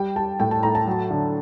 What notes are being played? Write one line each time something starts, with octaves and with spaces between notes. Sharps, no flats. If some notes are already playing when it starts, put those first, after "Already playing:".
Already playing: G3 G5
G3 A5
A2 G5
A5
A2 A#5
A5
F#3
D3